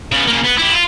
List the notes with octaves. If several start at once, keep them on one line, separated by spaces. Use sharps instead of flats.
C#3 B3
C#3 A#3
B3
E4 G4
F4